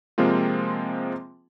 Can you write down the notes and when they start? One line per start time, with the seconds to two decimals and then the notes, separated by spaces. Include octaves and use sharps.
0.18 C3 F3 G#3 A#3 C4 F4